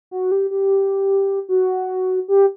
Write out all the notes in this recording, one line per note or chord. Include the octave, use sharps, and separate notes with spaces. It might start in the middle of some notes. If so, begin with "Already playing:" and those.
F#4
G4
G4
F#4
G4